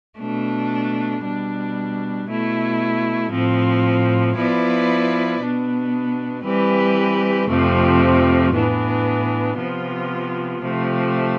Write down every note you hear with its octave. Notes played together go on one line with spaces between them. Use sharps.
B2 A3 D4
B2 G3 D4
B2 A3 E4
A2 F3 C4
F3 B3 E4 B4 D5
B2 B3 D4
E3 G3 C4 G4 B4
F2 C3 F3 A3 C4
A2 E3 B3 D4
C3 F3 B3 F4
C3 F3 A3